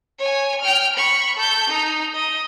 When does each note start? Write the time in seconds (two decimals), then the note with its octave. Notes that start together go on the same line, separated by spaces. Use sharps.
0.19 C#5 G#5
0.61 G5 F6
0.96 B5 C#6
1.36 A4 G6
1.69 D#4
2.14 D#5